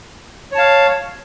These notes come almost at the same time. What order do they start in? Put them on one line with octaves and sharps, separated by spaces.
C#5 A5 F5